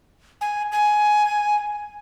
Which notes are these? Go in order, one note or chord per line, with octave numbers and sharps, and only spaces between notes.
G#5
G#5